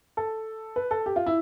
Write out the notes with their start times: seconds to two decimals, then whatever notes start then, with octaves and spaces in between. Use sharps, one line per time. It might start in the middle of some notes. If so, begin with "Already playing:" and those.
0.17 A4
0.76 B4
0.91 A4
1.06 G4
1.16 F4
1.26 E4